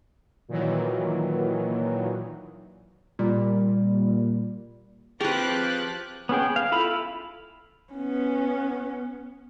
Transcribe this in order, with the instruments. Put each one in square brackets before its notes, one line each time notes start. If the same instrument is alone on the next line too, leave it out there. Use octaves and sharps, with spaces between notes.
[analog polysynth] A#2 D#3 E3 F#3
[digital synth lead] A#2 [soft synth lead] G3
[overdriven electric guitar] F3 [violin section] C4 D6 F#6 [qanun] G4 B4 [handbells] G#4
[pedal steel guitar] B3 C#4 G#4 G5
F5
E4 F4 A4 B5
[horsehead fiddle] B3 C#4